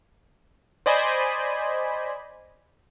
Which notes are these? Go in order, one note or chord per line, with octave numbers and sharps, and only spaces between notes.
C5 D5 D#5 G#5 B5